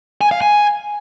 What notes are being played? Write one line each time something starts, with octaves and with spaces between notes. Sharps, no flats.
G#5
F5
G#5